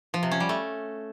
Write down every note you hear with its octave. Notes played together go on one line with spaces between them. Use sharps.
F3
C3
C#4
G3
A3